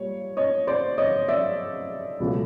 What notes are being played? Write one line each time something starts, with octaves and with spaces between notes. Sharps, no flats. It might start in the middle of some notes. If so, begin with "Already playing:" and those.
Already playing: A#2 G3 C#5
C#5 D#5
C5 D5
C#5 D#5
D5 E5
C#2 B2 F#3 A3